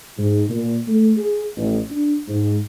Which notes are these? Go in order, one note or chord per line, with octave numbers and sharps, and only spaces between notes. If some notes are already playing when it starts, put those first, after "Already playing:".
G#2
A#2
A3
G#4
A1
D4
G#2